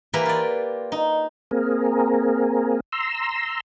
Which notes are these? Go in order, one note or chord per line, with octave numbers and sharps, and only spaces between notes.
E3 A#3 G4 B4 A#5 C6
F4 D5
D#4
A#3 C4 G#4 A#4
A#5 C6 E6